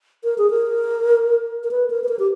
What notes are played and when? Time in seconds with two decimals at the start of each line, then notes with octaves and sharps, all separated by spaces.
0.24 A#4
0.38 G#4
0.50 A#4
1.64 A#4
1.71 B4
1.90 A#4
2.04 B4
2.09 A#4
2.19 G4